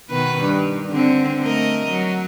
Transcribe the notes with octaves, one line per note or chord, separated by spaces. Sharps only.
B2 D#3 B4
G2
D3 C4
A3 A#4 D#5
F#3